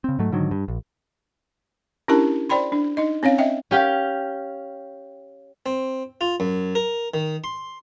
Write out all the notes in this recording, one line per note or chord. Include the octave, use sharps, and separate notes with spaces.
C#3 C4
G#2 F#3 A3
G#2 D3 D#3 F#3
G2
A#1
C#4 D4 E4 G4 A#4 A5
C5 D5 G5 B5 C6
D4
D#4 D#5
C4 C#4 C#5 F5
D#5 E5 G5
C#4 G4 F5 G5
C4
F4
F#2
A#4
D#3
C6